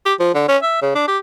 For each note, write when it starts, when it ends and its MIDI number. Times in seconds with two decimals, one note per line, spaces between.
0.06 0.14 67
0.19 0.32 53
0.34 0.44 50
0.48 0.58 61
0.63 0.80 76
0.82 0.93 49
0.95 1.05 62
1.08 1.18 67